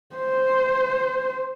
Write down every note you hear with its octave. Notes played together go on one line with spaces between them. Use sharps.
C5